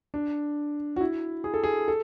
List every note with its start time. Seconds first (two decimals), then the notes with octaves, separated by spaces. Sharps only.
0.14 D4
0.96 F#4
1.01 E4
1.44 G#4
1.54 A4
1.64 G#4
1.88 A4